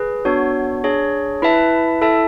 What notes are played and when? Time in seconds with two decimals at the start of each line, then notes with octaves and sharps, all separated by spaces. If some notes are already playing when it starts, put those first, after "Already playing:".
Already playing: G#4 B4
0.25 B3 D4 F#4 C#5
0.84 D4 G#4 C#5
1.42 E4 B4 E5 A5
2.01 E4 A4 E5 A5